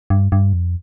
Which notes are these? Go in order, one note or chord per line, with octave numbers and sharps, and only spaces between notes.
G2
G2
F2